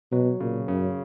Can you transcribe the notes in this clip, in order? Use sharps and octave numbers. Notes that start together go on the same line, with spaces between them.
B2 F#3
A#2 C#3
F#2 C#3